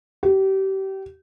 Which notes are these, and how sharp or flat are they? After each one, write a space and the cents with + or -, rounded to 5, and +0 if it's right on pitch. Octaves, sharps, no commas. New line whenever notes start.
G4 -30